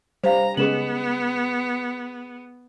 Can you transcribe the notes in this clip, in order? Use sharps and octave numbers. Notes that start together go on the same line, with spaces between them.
G3 C5 F5 A#5
C#3 G#3 B3 G#4 B4 E7 F#7